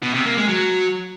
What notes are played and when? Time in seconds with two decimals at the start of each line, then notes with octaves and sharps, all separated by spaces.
0.03 B2
0.14 C3
0.26 A#3
0.37 G#3
0.49 F#3